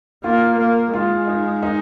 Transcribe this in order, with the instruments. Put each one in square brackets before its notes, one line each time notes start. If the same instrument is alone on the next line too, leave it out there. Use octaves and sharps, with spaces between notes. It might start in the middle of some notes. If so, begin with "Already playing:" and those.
[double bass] A#3 [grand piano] F4
[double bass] A#3
[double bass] G#3 [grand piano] F4
[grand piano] D#4
D#4